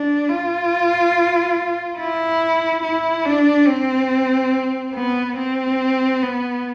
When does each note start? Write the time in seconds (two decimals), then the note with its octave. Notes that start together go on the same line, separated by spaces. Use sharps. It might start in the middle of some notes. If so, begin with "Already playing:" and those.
Already playing: D4
0.29 F4
1.98 E4
2.83 E4
3.26 D4
3.67 C4
4.95 B3
5.37 C4
6.22 B3